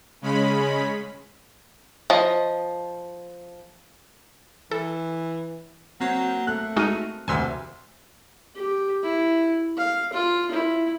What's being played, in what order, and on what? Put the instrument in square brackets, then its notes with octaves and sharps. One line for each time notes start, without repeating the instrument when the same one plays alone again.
[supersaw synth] C#3 G#3 C#4 B5
[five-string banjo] F3 D#5
[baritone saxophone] E3 [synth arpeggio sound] A4
[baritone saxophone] F#3 [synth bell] A#3 C4
[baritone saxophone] A3 [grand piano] F#6
[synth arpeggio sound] G#3 D#4 F#4 [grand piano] F6 D#7
[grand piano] F1 D2 C3 [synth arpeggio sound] G#5 C6 E6
[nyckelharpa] G4
E4
F5
F4
E4